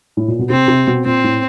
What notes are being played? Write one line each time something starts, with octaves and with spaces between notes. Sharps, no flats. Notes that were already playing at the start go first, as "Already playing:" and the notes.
A2
A#2
B2
C3 C4
C3
B2
A#2 C4
A2